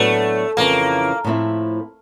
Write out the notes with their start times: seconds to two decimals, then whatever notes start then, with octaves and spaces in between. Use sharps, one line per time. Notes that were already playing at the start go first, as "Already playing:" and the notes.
Already playing: A2 F#3 A3 B3 D4 F#4
0.57 F2 C#3 E3 A3 A#3
1.24 A2 F3 A3 C4 E4